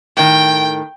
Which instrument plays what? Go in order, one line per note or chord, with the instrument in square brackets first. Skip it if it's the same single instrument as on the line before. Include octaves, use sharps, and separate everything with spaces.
[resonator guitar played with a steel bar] A2 D#3 [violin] G5